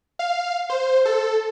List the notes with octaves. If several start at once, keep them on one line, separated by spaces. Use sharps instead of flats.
F5
C5
A4